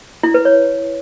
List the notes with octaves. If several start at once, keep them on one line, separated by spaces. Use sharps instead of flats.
E4
B4
C#5